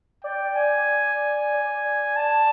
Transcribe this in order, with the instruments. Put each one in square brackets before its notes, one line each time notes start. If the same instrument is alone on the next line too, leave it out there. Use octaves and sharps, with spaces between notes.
[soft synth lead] D5 [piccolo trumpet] G5
[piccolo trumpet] G#5
[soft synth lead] D5
[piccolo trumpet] A5